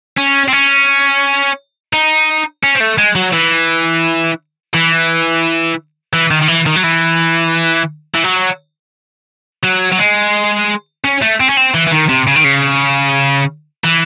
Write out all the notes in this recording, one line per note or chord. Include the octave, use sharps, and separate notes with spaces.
C#4
C4
C#4
D#4
C#4
C4
A3
G#3
F#3
E3
E3
E3
D#3
D#3
E3
D#3
F#3
E3
E3
F#3
F#3
F#3
G#3
C#4
A3
C4
C#4
C4
E3
E3
D#3
C3
C#3
D#3
C#3
E3